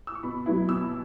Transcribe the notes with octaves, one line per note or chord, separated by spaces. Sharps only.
E6
C#6
B2 B5
F#3 B3 E4
B2 E6